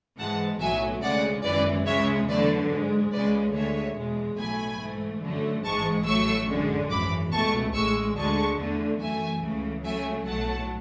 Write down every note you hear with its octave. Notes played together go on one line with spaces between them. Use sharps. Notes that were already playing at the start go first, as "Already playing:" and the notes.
G#2 E3 G#3 F#5 A5
B1 A2 F#3 E5 G#5
D2 C#3 G#3 D5 F#5
G#1 F#2 E3 B4 D5
C#2 C#3 G#3 C#5 E5
E2 D3 F#3 A3 B4 D5
G#2 G#3
C#2 C#3 G#3 B4 D5
D2 D3 G#3 C#5 E5
E2 B2 G#3
B1 A2 F#3 A3 G#5 B5
G#2 E3 A3
F#2 D3 F#3 A3
A1 G#2 E3 G#3 A5 C#6
A1 A2 F#3 A3 C#6 E6
F#2 D3 G#3
G#1 F#2 E3 B5 D6
C#2 B2 A3 A5 C#6
A1 A2 G#3 C#6 E6
D2 D3 G#3 A5 C#6
E2 D3 A3
F#2 E3 A3 E5 G#5
C#2 C#3 E3 A3
C#2 C#3 F#3 A3 E5 G#5
B1 A2 F#3 A3 F#5 A5